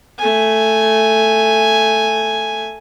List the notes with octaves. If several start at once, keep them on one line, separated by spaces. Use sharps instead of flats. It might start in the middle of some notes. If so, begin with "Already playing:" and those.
A3 G#5